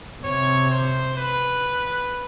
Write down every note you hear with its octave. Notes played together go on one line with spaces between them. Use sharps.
C3 C#5
C5
B4